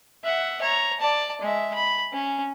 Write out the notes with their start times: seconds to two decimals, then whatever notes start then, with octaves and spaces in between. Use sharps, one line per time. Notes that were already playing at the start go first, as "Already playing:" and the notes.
0.24 E5 F#5
0.61 C#5 A#5
1.00 D5 A5
1.42 G#3 E5
1.74 B5
2.13 C#4